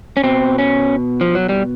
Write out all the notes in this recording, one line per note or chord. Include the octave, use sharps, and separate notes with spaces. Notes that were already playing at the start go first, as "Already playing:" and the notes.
C#4
B2 C4
C#4
F3
F#3
G3